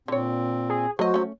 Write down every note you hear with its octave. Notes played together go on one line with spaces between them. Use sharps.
A#2 D3 C4 C#5
G#4
F#3 A3 F#4 C5 D#5
A3 C#4